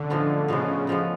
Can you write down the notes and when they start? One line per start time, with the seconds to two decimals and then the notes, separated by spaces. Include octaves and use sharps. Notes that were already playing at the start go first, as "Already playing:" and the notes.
Already playing: D3 C#4
0.10 A2 F3 G#3 B3
0.48 A2 C#3 F3 G#3 B3
0.87 A2 F3 G#3 B3